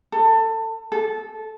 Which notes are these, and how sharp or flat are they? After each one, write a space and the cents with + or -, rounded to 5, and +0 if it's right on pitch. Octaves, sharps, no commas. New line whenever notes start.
A4 +25
A4 -15